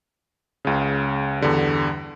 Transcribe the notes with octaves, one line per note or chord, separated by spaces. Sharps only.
C#2 C#3
E2 G2 D3 G3